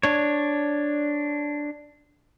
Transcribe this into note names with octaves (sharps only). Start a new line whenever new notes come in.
D4 C#5